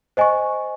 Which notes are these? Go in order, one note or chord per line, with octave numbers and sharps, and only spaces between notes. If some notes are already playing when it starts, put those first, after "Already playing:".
C5 D#5 G#5 C#6